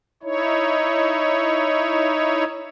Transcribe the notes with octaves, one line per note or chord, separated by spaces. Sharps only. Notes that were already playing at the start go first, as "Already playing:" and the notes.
D#4 E4 C#5